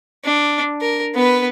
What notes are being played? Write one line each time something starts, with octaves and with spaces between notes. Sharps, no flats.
D4
A#4
B3 B4